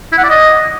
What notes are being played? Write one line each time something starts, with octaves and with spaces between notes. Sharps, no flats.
E4
F#5
D5
D#5